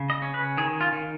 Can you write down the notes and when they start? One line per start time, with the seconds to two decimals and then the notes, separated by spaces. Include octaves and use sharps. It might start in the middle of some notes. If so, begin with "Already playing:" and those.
Already playing: C#3
0.10 D#5
0.22 C#4
0.34 B4
0.57 D#3 G#4
0.81 F4
0.92 D#3